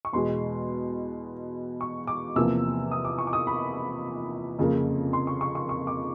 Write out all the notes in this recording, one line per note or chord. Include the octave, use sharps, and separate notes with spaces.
C#6
E2 B2 G#3 C6
C#6
D6
E2 C3 F3 A#3 E6
D#6
D6
C#6
D6
D#6
B5
F2 C#3 F3 A#3
C6
C#6
C#6
C#6
C#6
D6